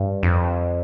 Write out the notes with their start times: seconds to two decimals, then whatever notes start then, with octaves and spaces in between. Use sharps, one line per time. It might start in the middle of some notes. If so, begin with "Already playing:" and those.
Already playing: G2
0.23 F2